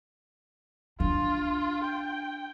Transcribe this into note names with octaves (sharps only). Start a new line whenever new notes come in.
D4 F4
G5